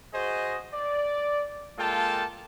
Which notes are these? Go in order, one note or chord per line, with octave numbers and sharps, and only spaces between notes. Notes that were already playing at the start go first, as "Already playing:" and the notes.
F#4 G#4 C5 D#5
D5
G#3 A#3 F4 A4 G5 A5